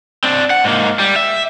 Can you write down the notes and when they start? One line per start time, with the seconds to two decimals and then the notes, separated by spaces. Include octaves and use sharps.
0.24 C4 D4
0.50 F#5
0.64 G#2 A#3
0.99 G3
1.16 E5